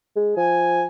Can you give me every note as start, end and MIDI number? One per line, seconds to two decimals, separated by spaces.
0.16 0.34 56
0.37 0.85 53
0.37 0.84 80